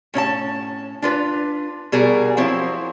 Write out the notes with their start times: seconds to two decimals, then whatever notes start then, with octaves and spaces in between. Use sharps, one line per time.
0.14 A2 C#4 D#4 A5
1.02 D4 F4 B4
1.92 B2 G3 G#4 A#4
2.37 F3 F#3 C4 E4